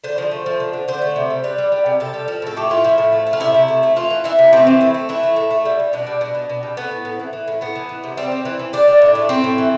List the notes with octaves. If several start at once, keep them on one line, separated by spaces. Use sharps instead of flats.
D3 C5
F3
A3
F3
D3
D3
D3 C5
A3
C3
G3
G3 B4
G3
G3
C3
C3 A4
G3
F3
A2 A4
A3 G4
A2 F4
F3 E4
A2
A3
A3
F4
C3 E4
C3
A3
A3
E3 F4
E3
E3 E4
C3
A3 C4
E3
A3
A3
E3 E4
A3
A2
A3
G3
G3
B2 D4
G3
B2
B2
B2
G3
A3 B3
A2
A2
E3
E3
A2
A2 B3
E3
E3
C3
G3 C4
G3
E3
E3
G3 D4
G3
A2
A3
A2 C4
A2
E3